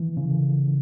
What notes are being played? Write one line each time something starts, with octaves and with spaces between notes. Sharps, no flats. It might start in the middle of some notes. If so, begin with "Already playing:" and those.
Already playing: E3
C#3